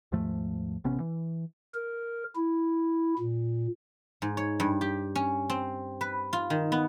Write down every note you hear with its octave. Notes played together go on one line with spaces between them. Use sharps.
D#2 G#2 F3 A3
A1 C3 B3 C#4
E3
A#4
E4
A#2
G#2
C#5
G2
G4
C#4
C4
B4
F4
D#3
B3